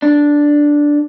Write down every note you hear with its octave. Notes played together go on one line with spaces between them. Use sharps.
D4